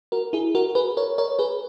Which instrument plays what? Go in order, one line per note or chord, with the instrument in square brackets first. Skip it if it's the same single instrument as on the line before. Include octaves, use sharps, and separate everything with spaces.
[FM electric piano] F#4 A#4
E4 G#4
F#4 A#4
G#4 B4
A#4 C#5
A#4 C#5
G#4 B4